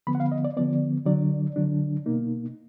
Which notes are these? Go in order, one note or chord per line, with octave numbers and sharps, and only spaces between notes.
D3 F3 B3 B5
F#5
F5
D#5
D5
D3 F3 B3 D5
D3 F#3 D4 D5
D3 F#3 D4
B2 A#3 D#4